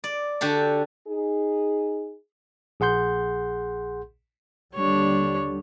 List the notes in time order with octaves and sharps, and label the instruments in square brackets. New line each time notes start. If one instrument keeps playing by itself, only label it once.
[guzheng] D5
D3 F#4 G4 A4
[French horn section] D#4 G#4
[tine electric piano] A#1 G#4 F#5 C6 G6
[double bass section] D#2 D3 G3 [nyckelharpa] D4 C#5